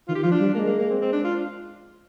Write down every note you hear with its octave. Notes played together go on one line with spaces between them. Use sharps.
D#3 F4
G4
F3 F4
D4
G3
G#3 A#3
A#3
A#3
C4
C4
D4
F4